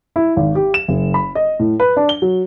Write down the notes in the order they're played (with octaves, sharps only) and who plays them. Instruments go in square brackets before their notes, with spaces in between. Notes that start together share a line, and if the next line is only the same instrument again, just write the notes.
[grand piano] E4
G#1
G4
E7
F#1
B5
D#5
A2
B4
D4
G7
F#3